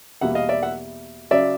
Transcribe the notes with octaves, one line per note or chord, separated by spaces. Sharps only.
E2 B2 G3 A#3 E5 F#5
D#5 F5
D5 E5
E5 F#5
C#3 F#3 D5 E5